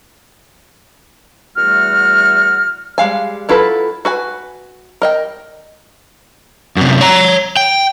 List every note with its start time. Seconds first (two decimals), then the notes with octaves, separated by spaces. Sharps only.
1.56 E2 G3 A3 F#4 F6
2.98 G3 G#3 F5 G#5
3.49 F#3 E4 F4 A4 B4
4.05 F#4 B4 G#5
5.02 A#4 D#5 G5
6.76 F#2 C3
7.01 C#5 A#5
7.57 G5